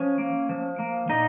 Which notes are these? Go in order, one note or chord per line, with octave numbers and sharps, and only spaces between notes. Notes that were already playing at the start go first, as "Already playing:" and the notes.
Already playing: F3 C#4
A#3
F3
A#3
A#2 D#4 D#5